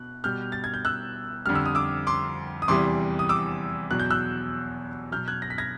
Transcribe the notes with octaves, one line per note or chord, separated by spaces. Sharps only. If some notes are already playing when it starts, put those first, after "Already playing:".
Already playing: B2 F#6
B2 G3 F6 G6
A6
G#6
G6
E6 F#6
F2 D3 G3 F6
E6
D#6
D6 E6
C6 D6
D#6
E2 C3 E3 G3 C6 D6
D#6
D6 E6
E2 B2 F#3 F#6
G6
E6 F#6
B2 F#3 F6 G6
F#6 G#6
A#6
B6
G#6 A#6